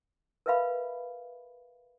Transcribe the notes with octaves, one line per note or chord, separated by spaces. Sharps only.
A#4 B4 E5 F5 B5